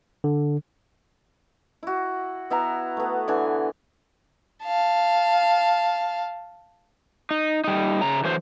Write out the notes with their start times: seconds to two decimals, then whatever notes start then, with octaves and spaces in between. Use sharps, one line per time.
0.24 D3
1.83 E4 F#4
2.50 B3 E4 G#5 A#5
2.97 A3 B3
3.28 D3 E3 G#5
4.64 F5 A5
7.31 D#4
7.64 G3 D#4
8.01 C#3 A#5
8.24 D3 E3 F#3 C5